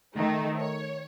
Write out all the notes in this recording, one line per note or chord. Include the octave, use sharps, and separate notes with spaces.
D#3 A3 D#4
C#5